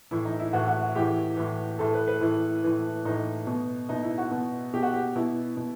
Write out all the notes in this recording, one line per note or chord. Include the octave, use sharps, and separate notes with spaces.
A2 E3 E4
D#4
E4
A2 E3 F#4
F#4
F#4
A2 E3 G4
A2 E3
A2 E3 A4
B4
B4
A2 E3 E4
A2 E3
A2 E3 D#4
B2
B2 D#4
E4
F#4
B2
B2 G4
F#4
G4
B2 E4
B2